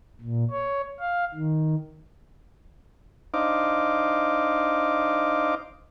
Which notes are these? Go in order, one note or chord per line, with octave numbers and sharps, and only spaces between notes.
A#2
C#5
F5
D#3
D4 D#4 C5 D#5 F5 D6